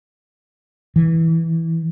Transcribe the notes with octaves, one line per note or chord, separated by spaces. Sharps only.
E3